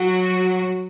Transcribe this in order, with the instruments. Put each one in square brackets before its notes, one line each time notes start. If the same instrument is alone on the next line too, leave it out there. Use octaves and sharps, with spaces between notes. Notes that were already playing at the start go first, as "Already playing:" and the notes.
Already playing: [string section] F#3 F#4